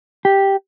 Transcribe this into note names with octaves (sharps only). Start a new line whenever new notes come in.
G4